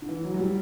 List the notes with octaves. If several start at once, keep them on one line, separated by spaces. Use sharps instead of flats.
D3
E3
F#3
F#3
G3